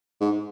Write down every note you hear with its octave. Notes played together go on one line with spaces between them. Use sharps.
G#2